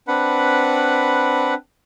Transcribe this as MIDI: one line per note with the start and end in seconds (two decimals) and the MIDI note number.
0.08 1.54 60
0.08 1.54 62
0.08 1.54 71
0.08 1.54 78
0.08 1.54 83